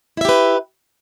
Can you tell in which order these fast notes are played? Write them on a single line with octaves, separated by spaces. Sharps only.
E4 E5 G4 B4